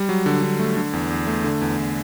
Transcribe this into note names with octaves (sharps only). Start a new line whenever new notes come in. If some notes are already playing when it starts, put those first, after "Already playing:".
Already playing: G3
F#3
D3
D3
A3
D3
E2
E2
A3
D3
E2
E2